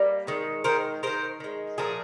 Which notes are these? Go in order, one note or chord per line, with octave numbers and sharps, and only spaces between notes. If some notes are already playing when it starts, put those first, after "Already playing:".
Already playing: G3 A#3
D#3 G#3
D#3 G#3 A#4 C5
D#3 G#3 A#4 C5
D#3 G#3
A#2 F3 A3 G#4 A#4